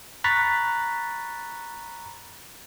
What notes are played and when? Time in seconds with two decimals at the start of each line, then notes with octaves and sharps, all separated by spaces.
0.24 A#5 B5 C#6 F#6 A6 B6